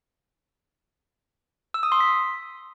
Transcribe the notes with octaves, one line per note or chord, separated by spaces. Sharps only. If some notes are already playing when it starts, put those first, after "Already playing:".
E6
D#6
C6
B6